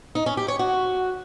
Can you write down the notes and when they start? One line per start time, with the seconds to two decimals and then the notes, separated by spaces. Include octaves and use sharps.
0.15 D#4
0.26 C#4
0.37 G4
0.48 C#5
0.59 F#4